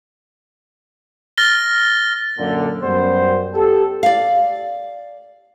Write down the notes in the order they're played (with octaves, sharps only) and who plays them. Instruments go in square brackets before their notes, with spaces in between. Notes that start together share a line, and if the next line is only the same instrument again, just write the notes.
[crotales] F6 A6 A#6 G7
[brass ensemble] F#2 A#2 D3
F#2 G3 B3 C5
G4 A4
[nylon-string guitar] D5 F5